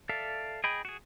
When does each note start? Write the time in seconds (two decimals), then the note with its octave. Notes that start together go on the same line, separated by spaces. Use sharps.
0.09 A4 D5 E5 F5
0.64 G#4 D#5 G5 B5
0.85 F#4 G#4